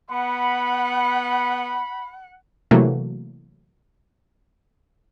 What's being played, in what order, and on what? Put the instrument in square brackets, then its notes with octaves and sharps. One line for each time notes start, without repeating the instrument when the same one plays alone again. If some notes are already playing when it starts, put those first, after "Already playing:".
[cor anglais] B3 [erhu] F#5 [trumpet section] B5
[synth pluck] C3 E3 F#3 A3 A#3